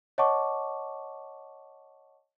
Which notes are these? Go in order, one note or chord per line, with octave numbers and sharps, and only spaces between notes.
C#5 D#5 F#5 A5 C#6 D6